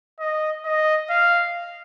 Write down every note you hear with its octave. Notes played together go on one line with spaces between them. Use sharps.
D#5
D#5
F5